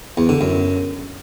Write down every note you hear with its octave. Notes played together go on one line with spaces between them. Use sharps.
E2
D3
F#2